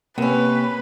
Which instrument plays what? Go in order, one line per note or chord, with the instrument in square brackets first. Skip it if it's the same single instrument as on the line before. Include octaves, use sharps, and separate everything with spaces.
[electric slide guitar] C3 [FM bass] A#3 [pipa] B3 C#4 [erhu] B4